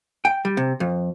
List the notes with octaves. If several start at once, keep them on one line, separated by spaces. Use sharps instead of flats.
G5
G3
C3
F2